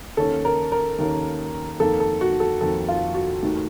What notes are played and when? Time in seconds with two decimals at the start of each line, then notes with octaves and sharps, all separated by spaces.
0.17 D#2 D#3 A#3 C#4 A4
0.45 A#4
0.72 A#4
0.98 D#2 D#3 A#3 C#4
1.80 F2 D#3 A#3 A4
2.00 A4
2.21 F#4
2.40 A4
2.61 F2 D#3 A#3 A4
2.89 F4
3.14 F#4
3.43 D#2 D#3 A3